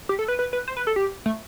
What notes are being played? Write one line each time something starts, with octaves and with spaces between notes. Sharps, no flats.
G4
A4
B4
B4
B4
C5
B4
A4
G4
A3